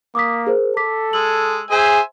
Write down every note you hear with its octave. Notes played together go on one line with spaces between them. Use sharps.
A#3 D6 D#6 B6
G#4 A#4 C5
A4 D6 B6
G#3 E6 F#7
G#4 C5 E5 G#5